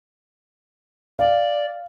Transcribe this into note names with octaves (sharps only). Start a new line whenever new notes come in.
D5 F5